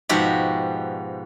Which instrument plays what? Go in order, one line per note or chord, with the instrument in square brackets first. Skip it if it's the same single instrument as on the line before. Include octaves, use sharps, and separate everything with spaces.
[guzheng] G#2 B2 F3 F#4 G4